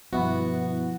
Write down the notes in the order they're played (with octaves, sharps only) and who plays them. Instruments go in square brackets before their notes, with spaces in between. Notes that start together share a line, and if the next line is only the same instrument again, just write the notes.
[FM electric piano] G2 B2 E4 [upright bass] F3 [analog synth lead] B3 [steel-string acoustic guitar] F#4